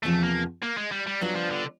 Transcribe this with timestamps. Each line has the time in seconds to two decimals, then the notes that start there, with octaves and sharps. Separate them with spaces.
0.03 E2 C3 F3 A3
0.23 A#3
0.63 A#3
0.77 G#3
0.92 G3
1.07 G3
1.21 F#3 G3 B3 D4 F4
1.36 F3
1.51 D3